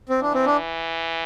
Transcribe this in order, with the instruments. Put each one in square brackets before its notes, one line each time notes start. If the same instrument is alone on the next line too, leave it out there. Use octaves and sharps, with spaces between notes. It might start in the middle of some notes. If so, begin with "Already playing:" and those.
[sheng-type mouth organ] C4
[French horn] E3 [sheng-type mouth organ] D4
[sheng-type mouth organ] C4
D4